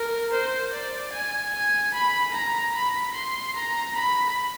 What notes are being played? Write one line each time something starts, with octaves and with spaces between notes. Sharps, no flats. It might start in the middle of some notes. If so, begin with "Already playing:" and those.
Already playing: A#4
C5
D5
G#5
G#5
B5
A#5
B5
C6
A#5
B5